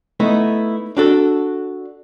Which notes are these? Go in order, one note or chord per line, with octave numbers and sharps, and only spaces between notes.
A3 B3 D#4 E4
D4 F#4 A4